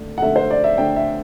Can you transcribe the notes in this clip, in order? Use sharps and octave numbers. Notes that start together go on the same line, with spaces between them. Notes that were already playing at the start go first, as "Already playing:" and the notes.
Already playing: D3 A3 D4
F#5
D3 A3 D4 E5
C5
D5
E5
D3 A3 D4 G5
E5